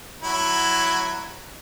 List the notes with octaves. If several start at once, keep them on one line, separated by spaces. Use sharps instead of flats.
F#3 E4